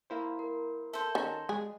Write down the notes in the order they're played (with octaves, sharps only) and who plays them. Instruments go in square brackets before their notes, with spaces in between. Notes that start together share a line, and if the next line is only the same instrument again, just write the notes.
[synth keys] A#3 E4 C5
[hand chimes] A#4
[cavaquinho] A4 C5 [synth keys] E5
[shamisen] D#3 C#4 [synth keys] A#5
[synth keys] G#3 [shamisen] G#4